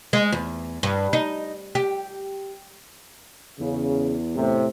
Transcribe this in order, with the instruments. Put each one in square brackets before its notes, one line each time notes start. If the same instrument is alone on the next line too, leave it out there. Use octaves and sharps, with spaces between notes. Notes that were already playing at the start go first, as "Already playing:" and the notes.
[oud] G#3
E2
G2
D#4
G4
[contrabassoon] E2 [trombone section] C#3
[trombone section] A2 C3